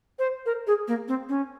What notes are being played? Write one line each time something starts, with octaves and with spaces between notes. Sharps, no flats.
C5
A#4
G#4
A#3
C4
C#4